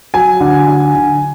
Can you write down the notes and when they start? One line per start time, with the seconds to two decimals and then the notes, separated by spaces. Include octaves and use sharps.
0.14 F#3 G#5
0.40 D3
0.68 D3
0.95 D3